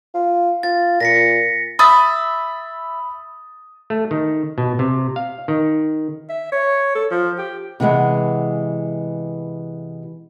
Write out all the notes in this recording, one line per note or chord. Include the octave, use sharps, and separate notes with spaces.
F4
F4 A6
A#2 A#6 B6 C#7
E5 B5 D#6 A6
A3
D#3
B2
C3
F5
D#3
E5
C#5
A4
F3
G4
C3 E3 G#3 B3